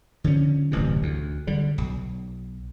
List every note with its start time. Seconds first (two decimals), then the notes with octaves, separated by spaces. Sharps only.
0.24 D3 F3 C#4
0.72 D1 A1 G2 C3
1.03 D2
1.47 D3 G3
1.78 B1